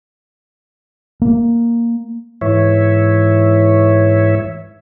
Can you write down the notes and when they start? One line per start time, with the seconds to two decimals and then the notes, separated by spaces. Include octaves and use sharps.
1.22 A#3
2.41 G#2 E3 C#5 E5